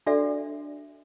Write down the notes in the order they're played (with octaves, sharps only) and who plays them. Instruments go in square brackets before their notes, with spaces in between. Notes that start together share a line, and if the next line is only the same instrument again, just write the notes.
[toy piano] D4 F#4 A4 D5 E5